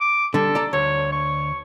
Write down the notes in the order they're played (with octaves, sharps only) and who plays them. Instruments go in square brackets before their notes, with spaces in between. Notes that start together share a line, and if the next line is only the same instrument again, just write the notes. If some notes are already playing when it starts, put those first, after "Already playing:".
[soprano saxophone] D6
[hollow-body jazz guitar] D3 G3 [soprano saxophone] A4
[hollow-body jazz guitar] D5 A#5
[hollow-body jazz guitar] D2 [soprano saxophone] C#5
[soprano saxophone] C#6